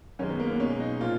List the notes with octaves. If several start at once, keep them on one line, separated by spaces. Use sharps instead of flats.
F#2 D#3 G#3 C#4
B3
A#3
B3
B2 G#3 C#4
D#4
A#2 F3 F4